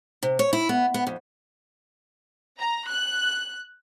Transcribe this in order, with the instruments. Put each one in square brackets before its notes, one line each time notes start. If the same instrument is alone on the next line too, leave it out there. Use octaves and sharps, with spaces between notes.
[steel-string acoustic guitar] C3
C#5
E4
B3
B3
F2
[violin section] A#5
F#6